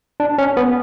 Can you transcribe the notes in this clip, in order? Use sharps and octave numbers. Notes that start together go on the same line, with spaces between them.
D4
C#4
B3